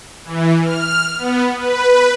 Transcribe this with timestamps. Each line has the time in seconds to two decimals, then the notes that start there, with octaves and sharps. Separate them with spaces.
0.25 E3
0.64 F6
1.18 B3
1.56 B4